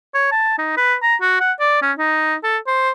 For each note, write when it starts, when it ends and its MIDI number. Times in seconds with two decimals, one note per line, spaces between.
0.14 0.28 73
0.32 0.55 81
0.59 0.75 63
0.77 0.95 71
1.03 1.16 82
1.22 1.39 66
1.40 1.52 78
1.60 1.82 74
1.82 1.92 61
1.98 2.35 63
2.44 2.58 69
2.67 2.91 72